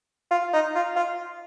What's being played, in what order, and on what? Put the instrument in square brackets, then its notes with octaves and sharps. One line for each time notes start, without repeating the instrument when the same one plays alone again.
[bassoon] F4
D#4
F4
F4